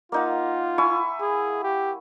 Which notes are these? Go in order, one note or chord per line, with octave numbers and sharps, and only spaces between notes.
A#3 D#4 F4 F#5
E4 G#5 C#6
G#4
G4